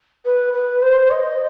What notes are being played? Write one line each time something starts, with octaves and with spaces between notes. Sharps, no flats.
B4
B4
C5
D#5